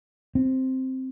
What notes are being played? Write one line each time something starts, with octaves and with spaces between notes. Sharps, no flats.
C4